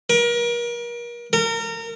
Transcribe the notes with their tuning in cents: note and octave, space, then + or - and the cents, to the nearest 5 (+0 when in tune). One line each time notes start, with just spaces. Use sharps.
A#4 +35
A#4 -30